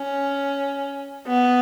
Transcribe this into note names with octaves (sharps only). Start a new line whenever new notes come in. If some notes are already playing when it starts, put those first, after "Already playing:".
Already playing: C#4
B3